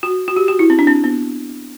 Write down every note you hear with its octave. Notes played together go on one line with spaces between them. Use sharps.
F#4
F#4
G4
F#4
E4
C4
D4
C4
B3